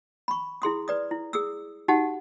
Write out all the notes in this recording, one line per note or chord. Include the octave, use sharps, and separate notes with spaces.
B5 C#6
E4 G#4 C6 D#6
B4 D5 D#6
E4
G#4 D#6 E6
D#4 F#4 G4 F#5 A5